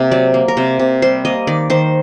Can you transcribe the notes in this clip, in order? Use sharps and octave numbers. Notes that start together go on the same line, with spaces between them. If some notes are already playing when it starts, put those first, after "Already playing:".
Already playing: C3 A#3
F#3 D5
A#3
A#4
C3 C5
C3
G3 C5
A#3 D#5
D#3 D5
D#3 C5